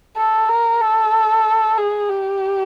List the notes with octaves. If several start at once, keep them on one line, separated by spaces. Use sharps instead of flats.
A4
A#4
A4
G#4
G4